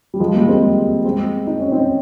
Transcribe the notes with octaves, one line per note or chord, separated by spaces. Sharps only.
G3
F3 G#3
G3 A#3
G#3 C4
G#3 C4
D#4
C#4
C4 D#4